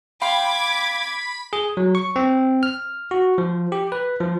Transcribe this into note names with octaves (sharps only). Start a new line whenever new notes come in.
F5 G5 B5 C6 D6 G#6
G#4
F#3
C#6
C4
F6
F#4
F3
G4
B4
F3